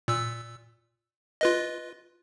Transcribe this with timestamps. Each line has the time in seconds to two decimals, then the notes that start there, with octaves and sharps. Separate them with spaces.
0.08 A#2 E6
1.41 F4 B4 D#5